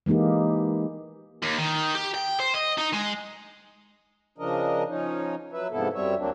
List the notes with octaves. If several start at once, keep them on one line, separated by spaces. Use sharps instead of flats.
E3 G#3 A#3 D#4 G4
D#2
D#3
G4
G5
C5
D#5
D#4
G#3
C#3 F3 D4 A#4 D#5
F3 C#4 D#4
F#3 B4 E5
G#2 C3 F3 B3 E4 A4
F#2 G3 C4 C#5 E5
D2 F#3 A#3 C4 D4